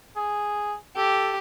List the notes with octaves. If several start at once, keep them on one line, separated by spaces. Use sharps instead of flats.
G#4
G4 A4